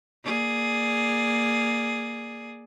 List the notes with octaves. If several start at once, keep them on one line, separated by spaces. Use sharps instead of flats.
A#3 G#4 D5